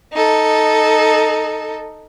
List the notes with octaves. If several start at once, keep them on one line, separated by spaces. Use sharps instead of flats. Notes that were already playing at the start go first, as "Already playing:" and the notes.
D#4 A4